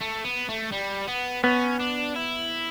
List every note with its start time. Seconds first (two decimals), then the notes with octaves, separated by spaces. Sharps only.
0.01 A3
0.25 B3
0.49 A3
0.72 G3
1.08 B3
1.44 B3 C#4
1.80 D4
2.16 E4